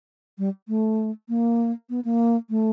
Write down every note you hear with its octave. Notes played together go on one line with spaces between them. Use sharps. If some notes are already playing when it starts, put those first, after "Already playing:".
G3
A3
A#3
B3
A#3
A3